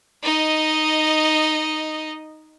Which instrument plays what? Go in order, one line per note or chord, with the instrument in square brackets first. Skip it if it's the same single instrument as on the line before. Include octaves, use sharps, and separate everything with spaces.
[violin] D#4 D#5